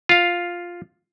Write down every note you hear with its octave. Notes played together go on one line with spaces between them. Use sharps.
F4 F5